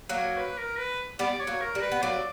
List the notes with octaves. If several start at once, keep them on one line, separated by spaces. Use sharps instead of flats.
F#3 A#3
C#5
B4
A#4
B4
G3 B3 D5
C#5
F#3 A#3
A#4
G3
B4
B3
F#3 A#3 D5